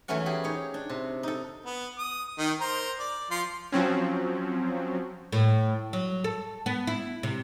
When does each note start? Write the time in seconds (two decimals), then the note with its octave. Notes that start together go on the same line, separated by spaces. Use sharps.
0.08 E2 E3 F#3 A3 C#4 F#5
0.26 G4 G#4
0.44 D#4 C#5
0.74 D4
0.89 C3
1.23 D#4 A4
1.66 B3
1.98 D#6
2.38 D#3 D#5
2.60 A#4 C5 A#5
2.99 D5
3.31 F3 F5 C6
3.72 F3 F#3 C4 C#4
5.33 A2
5.93 F#3
6.24 A4
6.66 B3
6.87 E4
7.23 C3